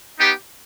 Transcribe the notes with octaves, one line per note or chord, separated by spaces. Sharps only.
B3 D#4 G4